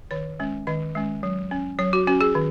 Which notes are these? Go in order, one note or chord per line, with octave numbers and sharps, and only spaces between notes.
D#3 C#5
G#3 C#4
D#3 D#5
G#3 C#4
F#3
C#4
F#3 C#5
F#4
C#4 F#4
G#4
D#3